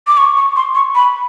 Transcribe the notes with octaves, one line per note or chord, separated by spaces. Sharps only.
D6
C#6
C#6
C6
C#6
B5